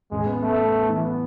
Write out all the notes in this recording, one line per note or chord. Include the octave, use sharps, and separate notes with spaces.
A1 G#3
B3
A3 B3
B3
B3
E3
B3